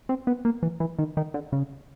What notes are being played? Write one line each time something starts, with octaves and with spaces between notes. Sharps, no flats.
C4
B3
A#3
E3
E3
D#3
D#3
D3
C#3